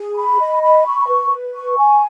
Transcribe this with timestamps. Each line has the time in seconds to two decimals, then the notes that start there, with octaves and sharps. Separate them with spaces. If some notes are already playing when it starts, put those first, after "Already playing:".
Already playing: G#4
0.16 B5
0.40 D#5
0.63 B5
0.85 C#6
1.09 B4
1.31 B4
1.54 C#6
1.78 G#5